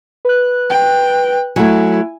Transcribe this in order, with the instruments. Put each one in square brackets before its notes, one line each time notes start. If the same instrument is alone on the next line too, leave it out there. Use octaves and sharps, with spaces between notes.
[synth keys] B4 F#6
[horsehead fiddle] G5
[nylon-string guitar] F#3 A3 [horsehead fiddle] E4 [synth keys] G#5